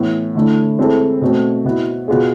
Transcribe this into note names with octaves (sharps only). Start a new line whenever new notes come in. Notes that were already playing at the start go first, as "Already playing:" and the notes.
Already playing: A2 E3 B3
D3 A3 E4
G#3 C4 E4 A4
B2 A3 C4
B2 B3 E4
B2 B3 F4 G#4